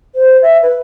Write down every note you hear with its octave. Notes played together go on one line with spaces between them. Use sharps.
C5
E5
B4